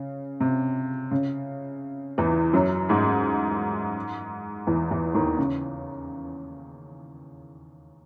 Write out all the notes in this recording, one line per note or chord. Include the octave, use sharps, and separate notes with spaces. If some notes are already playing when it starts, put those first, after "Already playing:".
Already playing: C#3
C3
C#3
E2 E3
F#2 F#3
G#2 G#3
E2 E3
E2 E3
D#2 D#3
C#3